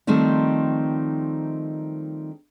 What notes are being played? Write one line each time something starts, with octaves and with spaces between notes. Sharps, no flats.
D#3 F3 G3 A3 C4 D#4